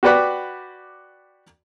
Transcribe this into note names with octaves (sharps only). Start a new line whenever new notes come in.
F#4 G4 B4 D5 F#5 B5